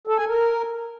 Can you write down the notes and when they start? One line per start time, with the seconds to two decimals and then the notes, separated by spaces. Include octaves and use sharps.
0.07 A4
0.18 G#5
0.28 A#4